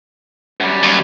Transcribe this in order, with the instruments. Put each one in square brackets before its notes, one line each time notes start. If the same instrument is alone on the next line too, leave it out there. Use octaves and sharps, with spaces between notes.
[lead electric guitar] F#2 G3
[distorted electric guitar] D#2